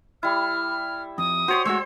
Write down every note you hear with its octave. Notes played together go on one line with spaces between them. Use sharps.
G3 E4 F6
F2 D#6
F#4 G4 C5 C#5 C6
G#3 A3 F#4 C5 E6